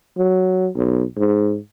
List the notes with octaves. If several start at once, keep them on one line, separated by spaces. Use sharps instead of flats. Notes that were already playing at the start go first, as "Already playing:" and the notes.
F#3
B1
G#2